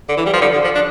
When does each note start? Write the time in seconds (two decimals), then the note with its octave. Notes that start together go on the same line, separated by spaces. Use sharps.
0.09 D3
0.17 E3
0.26 G3
0.34 F3
0.41 D3
0.53 D3
0.64 F3
0.75 D4